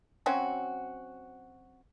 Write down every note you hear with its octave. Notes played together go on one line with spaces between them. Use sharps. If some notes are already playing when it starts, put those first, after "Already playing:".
F#3 C4 C#4 F#4